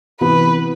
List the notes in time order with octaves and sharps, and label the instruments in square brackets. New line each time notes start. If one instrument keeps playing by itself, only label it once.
[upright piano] C3 E3 B3 [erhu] B4